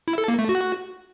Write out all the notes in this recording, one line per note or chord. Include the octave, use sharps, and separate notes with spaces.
E4
A4
A#3
A3
F#4